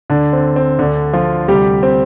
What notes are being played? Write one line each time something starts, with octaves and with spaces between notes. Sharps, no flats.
D2 D3 D4
C4
C4
D2 D3 D4
F3 F4
D2 C3 G3 G4
C4